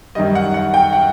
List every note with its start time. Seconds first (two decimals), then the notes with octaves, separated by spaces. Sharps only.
0.15 F#2 D#3 G3 D#5
0.35 F#5
0.54 F#5
0.74 G5
0.93 F#5